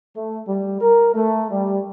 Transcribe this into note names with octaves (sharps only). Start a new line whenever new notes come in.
A3
G3
A#4
A3
G3